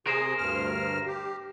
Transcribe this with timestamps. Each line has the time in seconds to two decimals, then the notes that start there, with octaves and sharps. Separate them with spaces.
0.07 C3 G#4 A#4 C5
0.38 D2 G2 F6
1.06 G4